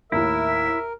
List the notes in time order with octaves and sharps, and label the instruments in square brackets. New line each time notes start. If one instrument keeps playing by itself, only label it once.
[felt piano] D#2 A2 [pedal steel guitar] E4 [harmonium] A#4 [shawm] E5